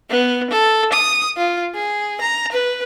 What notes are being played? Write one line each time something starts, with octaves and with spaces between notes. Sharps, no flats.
B3
A4
D#6
F4
G#4
A#5
B4